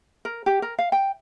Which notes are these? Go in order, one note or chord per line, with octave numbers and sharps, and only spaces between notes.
A#4
G4
A#4
F5
G5